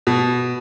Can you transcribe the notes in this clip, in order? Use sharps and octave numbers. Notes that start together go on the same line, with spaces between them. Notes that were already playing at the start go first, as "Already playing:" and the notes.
B2